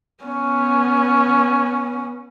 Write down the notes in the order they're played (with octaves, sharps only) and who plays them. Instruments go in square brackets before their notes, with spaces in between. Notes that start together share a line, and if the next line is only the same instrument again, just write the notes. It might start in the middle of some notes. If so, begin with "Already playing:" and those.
[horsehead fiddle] B3 C#4